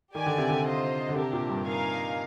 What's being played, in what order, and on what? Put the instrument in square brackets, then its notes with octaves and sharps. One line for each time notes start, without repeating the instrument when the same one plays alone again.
[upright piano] D#3 [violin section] G4 D5 G#5
[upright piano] D3
C3
D3
[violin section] F4 C5 D#5
[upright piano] D3
[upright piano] C3 [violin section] D4 G4 A#4
[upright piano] A#2
G2
[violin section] D#4 A#4 F5 G#5